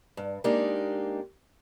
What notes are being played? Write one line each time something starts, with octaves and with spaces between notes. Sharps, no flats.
G2
G#3 A#3 D4 D#4 G4